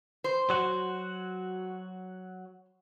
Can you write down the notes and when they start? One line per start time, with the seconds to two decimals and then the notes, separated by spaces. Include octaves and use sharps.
0.24 C5
0.50 F#3 F#4